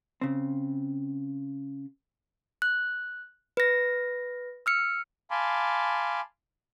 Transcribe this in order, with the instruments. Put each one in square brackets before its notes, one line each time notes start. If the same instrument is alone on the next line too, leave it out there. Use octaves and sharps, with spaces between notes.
[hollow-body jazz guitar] C#3 C4
[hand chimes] F#6
B4 A#6
E6 F6 C#7
[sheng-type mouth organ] F5 G#5 A5 B5 C6 D6